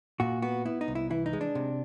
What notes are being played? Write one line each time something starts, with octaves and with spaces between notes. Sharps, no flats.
A#2 F#4
B3 F#4
B3 E4
D#4
C2
E4
E3 E4
D#4
G#3
D4
C3